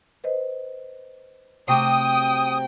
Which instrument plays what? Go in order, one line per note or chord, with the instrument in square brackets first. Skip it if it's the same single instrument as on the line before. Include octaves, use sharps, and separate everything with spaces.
[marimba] B4 C5 D#5
[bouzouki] C3 C4 F#4 [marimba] A3 D6 [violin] G5 [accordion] D#6